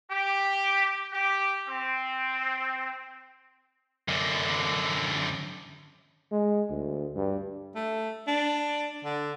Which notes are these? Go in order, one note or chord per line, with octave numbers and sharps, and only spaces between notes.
G4
G4
C4
F#2 D3
G#3
D2
G2
A3
D4
D3